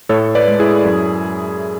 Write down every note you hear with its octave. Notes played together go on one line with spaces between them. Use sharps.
A2 A4 C#5
B4 D5
G#3
E4 G#4
F#2